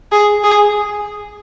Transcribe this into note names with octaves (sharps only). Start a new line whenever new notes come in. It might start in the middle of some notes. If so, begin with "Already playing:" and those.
G#4
G#4